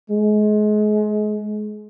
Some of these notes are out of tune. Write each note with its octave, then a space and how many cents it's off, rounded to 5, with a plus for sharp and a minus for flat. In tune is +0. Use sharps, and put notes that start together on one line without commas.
G#3 +30